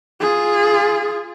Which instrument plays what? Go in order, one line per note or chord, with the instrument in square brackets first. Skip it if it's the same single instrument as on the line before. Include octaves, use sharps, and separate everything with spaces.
[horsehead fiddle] F4 G#4